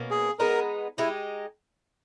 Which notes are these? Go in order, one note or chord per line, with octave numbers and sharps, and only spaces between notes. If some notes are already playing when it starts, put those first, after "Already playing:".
Already playing: B2 A#3 C#4
G#4
G#3 B3 D#4 A#4
G#3 D#4 E4 G4